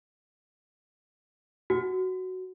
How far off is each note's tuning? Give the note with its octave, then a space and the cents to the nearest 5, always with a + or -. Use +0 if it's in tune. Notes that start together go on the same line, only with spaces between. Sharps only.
F#4 +5